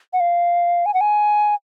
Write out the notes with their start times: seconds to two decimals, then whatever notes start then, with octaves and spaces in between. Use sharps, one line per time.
0.13 F#5
0.20 F5
0.86 G#5
0.94 F#5
1.01 G#5